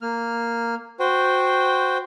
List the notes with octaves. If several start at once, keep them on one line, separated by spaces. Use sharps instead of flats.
A#3 F6
F#4 C5 G5